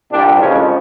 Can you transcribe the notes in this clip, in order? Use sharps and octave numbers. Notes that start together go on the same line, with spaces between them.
C2 A#2 G3 D4
F2 C#3 F3 G#3 C#4